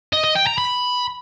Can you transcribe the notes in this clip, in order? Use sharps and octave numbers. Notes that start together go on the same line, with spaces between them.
D#5
D#5
G5
A#5
B5